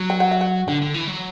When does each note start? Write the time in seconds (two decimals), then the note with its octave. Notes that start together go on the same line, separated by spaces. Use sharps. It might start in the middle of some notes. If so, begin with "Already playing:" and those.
Already playing: F#3
0.10 G5
0.20 F#5
0.31 E5
0.41 F#5
0.68 D3 G5
0.82 D3
0.94 E3
1.08 F#3